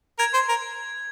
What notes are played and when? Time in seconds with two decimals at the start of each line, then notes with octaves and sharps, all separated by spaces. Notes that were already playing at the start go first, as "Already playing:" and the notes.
0.19 A#4 G#6
0.34 C5
0.49 A#4